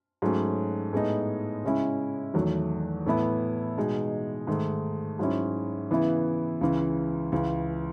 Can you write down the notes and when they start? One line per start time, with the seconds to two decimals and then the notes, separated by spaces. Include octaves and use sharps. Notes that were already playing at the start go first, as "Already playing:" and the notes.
0.22 G#2 F#3 A3 C#4
0.93 A2 G#3 B3 D#4
1.64 C#3 G#3 C#4 E4
2.34 E2 D#3 F#3 A3
3.06 A2 E3 B3 E4
3.77 B2 G#3 D#4
4.47 G#2 D#3 A3
5.19 G#2 F#3 C#4 E4
5.90 C#3 E3 B3 E4
6.61 C#2 C#3 E3
7.32 C#2 C#3 E3